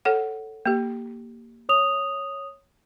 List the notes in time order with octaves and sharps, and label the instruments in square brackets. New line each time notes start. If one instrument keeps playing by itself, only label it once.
[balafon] A4 C#5 F#5
A#3 G4
[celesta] C#5 D#6 F7